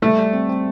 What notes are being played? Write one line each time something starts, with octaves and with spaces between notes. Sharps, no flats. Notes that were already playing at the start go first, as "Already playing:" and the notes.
G3 A3
G3
C4
C4